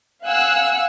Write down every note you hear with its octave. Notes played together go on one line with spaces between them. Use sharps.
F5 F#5 G#5 E6 F#6